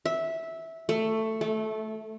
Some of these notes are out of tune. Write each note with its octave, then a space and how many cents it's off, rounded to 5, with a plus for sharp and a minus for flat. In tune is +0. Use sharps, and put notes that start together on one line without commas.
E5 -10
A3 +10
A3 -15